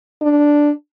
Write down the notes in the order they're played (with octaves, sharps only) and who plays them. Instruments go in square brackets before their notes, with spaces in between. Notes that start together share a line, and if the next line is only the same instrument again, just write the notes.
[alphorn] D4